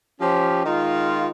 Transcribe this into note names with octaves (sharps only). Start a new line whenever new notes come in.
F3 C#4 G4
D#3 G#3 D#4 F4